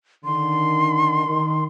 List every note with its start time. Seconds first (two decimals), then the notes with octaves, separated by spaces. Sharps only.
0.25 D3 D#3 C6
1.26 D#3